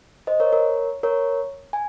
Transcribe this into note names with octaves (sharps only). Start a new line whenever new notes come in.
C5 D#5
A#4 C#5
A#4 C#5
A#4 C#5
G#5